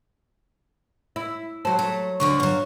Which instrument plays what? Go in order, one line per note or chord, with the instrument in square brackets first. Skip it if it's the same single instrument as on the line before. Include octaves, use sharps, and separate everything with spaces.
[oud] E4
[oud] F#3 C5 [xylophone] A5
[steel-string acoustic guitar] A3
[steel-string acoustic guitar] D2 D3 F3 [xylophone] C#6
[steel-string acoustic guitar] G2 F#3 [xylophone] C#5